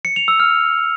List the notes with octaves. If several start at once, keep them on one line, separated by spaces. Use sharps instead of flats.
C#7
F7
E6
F6